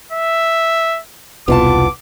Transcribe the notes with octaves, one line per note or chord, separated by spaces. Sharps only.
E5
E1 C2 B2 B3 F4 A5 D6